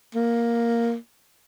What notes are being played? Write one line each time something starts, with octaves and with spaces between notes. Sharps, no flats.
A#3